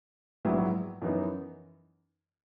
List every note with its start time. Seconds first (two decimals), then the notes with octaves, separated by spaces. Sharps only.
0.45 A#1 G#2 F#3 B3 E4
1.02 F#2 E3 B3 D#4